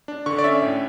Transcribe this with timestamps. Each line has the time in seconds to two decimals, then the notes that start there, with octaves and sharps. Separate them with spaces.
0.08 D4
0.26 D3 C#6
0.38 D5
0.44 C#4 E5
0.62 A2